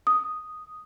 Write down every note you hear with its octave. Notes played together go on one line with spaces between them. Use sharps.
D#6